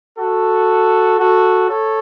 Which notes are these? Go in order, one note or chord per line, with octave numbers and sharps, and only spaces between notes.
F#4 A4
F#4 A4
A4 C#5